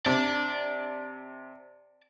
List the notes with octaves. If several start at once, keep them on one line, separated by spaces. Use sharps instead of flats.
C3 D5 A5